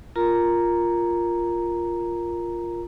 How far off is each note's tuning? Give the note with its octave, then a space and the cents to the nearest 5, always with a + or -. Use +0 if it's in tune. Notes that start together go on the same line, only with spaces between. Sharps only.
F4 +0 A#4 +0 A#5 +0